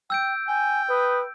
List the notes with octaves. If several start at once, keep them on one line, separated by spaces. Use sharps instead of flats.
G5 E6 G6 D7
G5 G#5
B4 D#6